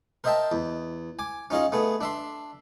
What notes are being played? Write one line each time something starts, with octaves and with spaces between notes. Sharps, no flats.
A#4 C5 D#5 E5 G5 A5
E2
G#5 D6
C#4 D#4 F4 G#4 D#5
A3 B3 G#4
D4 E5 C6